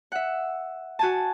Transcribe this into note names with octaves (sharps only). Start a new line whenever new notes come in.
E5 F#5
F#4 G#5 A5